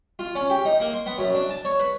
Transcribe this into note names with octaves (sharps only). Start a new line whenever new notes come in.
F4
C#4
G4
D#4
A#3
C6
B3
F#2
D4
A5
C#5
B4